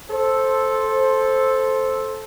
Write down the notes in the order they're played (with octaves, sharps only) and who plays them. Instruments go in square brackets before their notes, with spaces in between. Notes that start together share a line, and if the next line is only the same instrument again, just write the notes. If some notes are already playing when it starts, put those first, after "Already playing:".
[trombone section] A4 C5